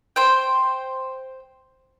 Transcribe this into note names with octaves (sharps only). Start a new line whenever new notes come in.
C5 G5